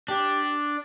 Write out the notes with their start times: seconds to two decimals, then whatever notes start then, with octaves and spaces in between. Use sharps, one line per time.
0.08 D4 G4